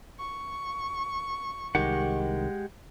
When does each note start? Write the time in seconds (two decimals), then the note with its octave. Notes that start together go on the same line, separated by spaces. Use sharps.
0.19 C#6
1.75 C2 D#3 G#3 G4 F#5